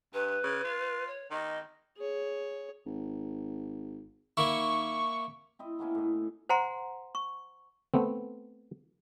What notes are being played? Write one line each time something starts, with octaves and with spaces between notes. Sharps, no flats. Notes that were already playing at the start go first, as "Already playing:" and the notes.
G2 B4
C#3
F4
C#5
D#3 D#5
G#4 C#5
G#1
D#3 A#3 E4 C#6
C4 E4 D#5
A#3 B3 C#4 E4
A2 D#5
C5 F#5 G#5 A#5 C6
C#6
A3 B3 C4